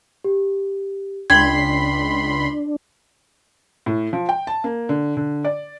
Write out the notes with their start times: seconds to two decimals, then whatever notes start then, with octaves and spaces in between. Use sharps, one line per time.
0.24 G4
1.30 C#2 D4 G5 B5 C6 G#6
3.86 A2
4.13 F3
4.29 G5
4.47 A5
4.64 A#3
4.89 D3
5.17 D3
5.45 D5